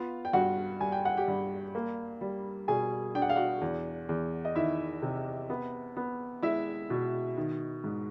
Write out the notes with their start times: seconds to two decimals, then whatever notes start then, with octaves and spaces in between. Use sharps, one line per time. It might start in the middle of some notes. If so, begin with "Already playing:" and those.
Already playing: B3 F4 F5
0.25 G5
0.33 G2 F#4 F#5
0.80 G3 G#5
0.92 G5
1.05 F#5
1.17 G4 G5
1.28 G2
1.75 A#3
2.21 G3
2.68 B2 G#4 G#5
3.15 D4 G5
3.22 F#5
3.29 F5
3.36 F#4 F#5
3.61 E2
4.09 E2
4.45 D#5
4.55 D#3 E4 E5
5.02 C3
5.50 B3
5.97 B3
6.43 G#3 E4 E5
6.90 B2
7.37 D#3
7.84 G#2